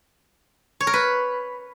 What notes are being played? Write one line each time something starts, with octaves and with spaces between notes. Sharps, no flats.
C#5
A#4
B4